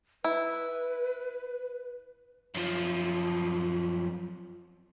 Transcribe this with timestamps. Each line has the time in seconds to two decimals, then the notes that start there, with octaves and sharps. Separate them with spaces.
0.24 E4 B4
2.55 F#2 F3